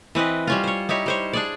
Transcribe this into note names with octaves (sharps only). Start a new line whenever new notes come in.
E3 C4 B4 D#5
G3 C#4 F4
C5 C#5
D#4 E4 G4 C#5
G3 C5 C#5
D4 G#4 D5